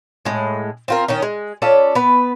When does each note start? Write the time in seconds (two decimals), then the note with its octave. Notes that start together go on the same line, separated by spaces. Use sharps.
0.25 A2 G#3
0.88 C4 F4 A#4
1.08 D#3 C#4 D#4
1.22 G#3
1.62 C#4 F4 A4 D5
1.95 B3 B4